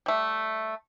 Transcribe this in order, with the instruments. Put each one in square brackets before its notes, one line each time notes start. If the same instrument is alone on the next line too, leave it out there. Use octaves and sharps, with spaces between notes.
[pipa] G3 A3